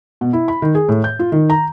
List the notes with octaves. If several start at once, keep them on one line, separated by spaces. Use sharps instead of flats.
B2
E4
B5
D#3
G#4
A2
G6
F4
D#3
A#5